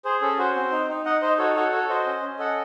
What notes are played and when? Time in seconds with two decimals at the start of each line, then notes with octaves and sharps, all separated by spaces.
0.05 G#4 C5
0.22 C#4 A4
0.39 F#4 C5
0.55 C4
0.72 D#4
0.89 D#4
1.05 D#4 D#5 F#5
1.22 D#4 C5 D#5
1.38 F#4 A4 C#5
1.56 F#4 A4 C#5
1.72 A4 C#5
1.89 F#4 C5 D#5
2.06 C#4
2.22 C#4
2.39 A4 D#5 F#5